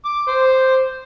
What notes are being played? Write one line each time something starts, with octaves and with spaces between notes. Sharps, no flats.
D6
C5